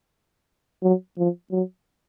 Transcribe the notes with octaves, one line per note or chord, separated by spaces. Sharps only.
F#3
F3
F#3